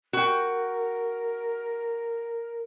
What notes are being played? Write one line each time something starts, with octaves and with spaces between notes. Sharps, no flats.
F#4 A#4 G5